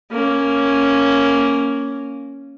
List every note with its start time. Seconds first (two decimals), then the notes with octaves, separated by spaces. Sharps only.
0.11 A#3 C#4